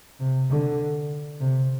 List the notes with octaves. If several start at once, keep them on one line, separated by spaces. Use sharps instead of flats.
C3
D3
C3